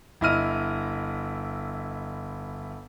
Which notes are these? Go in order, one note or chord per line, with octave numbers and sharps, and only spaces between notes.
G1 E4 D#5 F6 D#7